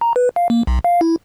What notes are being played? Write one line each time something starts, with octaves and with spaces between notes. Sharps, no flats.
A#5
B4
F5
A#3
B1
F5
E4